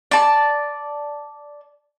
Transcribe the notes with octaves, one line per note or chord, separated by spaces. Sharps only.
D5 A5